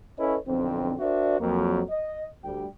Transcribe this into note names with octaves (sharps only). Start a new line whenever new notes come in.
C#4 E4 A4 B4 C#5 D#5
B1 F2 D3 C4
D4 F#4 A#4 C5 D5 E5
F2 F#3 A#3
D#5
D2 G3 G5